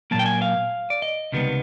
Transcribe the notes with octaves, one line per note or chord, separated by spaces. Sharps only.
A#2 F#3 A#3 A5
G5
G#5
F5
D5
D#5
C#2 C3 D#3 G3 B3